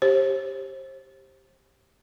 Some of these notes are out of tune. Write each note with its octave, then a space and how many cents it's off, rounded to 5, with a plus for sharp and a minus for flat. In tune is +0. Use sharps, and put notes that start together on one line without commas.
G4 +0 C5 +40